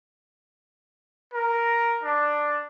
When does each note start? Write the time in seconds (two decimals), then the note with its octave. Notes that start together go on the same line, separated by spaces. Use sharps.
1.34 A#4
2.04 D4